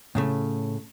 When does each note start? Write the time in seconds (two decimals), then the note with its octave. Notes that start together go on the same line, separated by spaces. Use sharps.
0.15 A2 C#3 A3